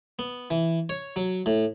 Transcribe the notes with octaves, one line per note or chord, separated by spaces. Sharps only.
B3
E3
C#5
F#3
A2